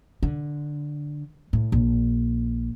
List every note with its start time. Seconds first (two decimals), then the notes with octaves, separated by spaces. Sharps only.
0.23 D3
1.53 A2
1.72 A#1